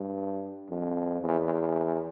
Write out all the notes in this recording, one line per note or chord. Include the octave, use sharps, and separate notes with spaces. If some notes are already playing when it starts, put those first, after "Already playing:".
Already playing: G2
F2
E2